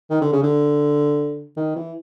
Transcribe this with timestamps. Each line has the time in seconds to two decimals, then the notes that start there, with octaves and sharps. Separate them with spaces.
0.10 D#3
0.22 D3
0.33 C#3
0.43 D3
1.56 D#3
1.76 E3